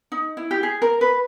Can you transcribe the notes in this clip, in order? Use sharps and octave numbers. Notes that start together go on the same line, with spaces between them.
D#4
E4
G4
G#4
A#4
B4